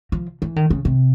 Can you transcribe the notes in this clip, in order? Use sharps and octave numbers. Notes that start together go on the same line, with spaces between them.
F3
E3
D#3
C#3
C3